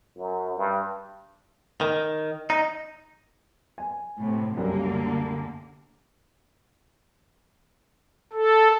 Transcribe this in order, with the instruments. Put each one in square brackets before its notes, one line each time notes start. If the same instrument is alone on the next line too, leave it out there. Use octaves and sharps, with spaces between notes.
[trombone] F#2
G2
[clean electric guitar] D#3
D#4
[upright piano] G#5
[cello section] A2 C3
[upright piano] C2 F#2 G3 [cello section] D3 A#3
[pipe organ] A4